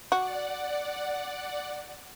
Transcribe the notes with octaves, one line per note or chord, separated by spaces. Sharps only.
F#4 D5 F#5